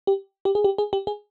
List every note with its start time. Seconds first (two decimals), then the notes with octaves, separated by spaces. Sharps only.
0.07 G4
0.45 G4
0.55 G#4
0.64 G4
0.78 G#4
0.93 G4
1.07 G#4